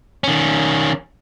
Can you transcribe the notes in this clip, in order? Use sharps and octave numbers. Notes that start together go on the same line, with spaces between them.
D#3 C#4